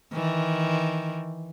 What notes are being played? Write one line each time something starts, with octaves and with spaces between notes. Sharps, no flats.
D#3 E3